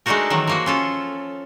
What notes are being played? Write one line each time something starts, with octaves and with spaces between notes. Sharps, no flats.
G#3 A3 D4 D#4 F#4 A#4
D#3 E3 F#3
F3 A#3 F#4
C#4 F4 A4